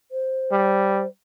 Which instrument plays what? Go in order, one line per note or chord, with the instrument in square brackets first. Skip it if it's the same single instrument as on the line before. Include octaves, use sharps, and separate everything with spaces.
[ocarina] C5
[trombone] G3